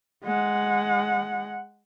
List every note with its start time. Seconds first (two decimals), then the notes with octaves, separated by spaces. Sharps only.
0.25 G#3 F#5